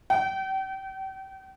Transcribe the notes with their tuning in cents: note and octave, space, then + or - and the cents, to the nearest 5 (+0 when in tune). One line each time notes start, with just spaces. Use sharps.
G5 -35